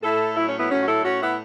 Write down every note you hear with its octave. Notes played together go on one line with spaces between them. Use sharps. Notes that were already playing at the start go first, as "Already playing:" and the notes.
A2 E4 A4
F#3 E4
C#4
B3 E4
A2 C#4 F#4
F#4
E4 A4
A2 C#4 F#4
B3 E4